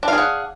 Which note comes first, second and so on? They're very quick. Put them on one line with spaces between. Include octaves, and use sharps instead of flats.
D4 F5 G#4 F#5